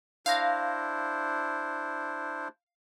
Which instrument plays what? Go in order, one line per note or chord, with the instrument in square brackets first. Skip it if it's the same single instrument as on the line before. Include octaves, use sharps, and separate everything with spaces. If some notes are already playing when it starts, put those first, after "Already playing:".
[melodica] D4 E4 C5 [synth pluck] F5 A#6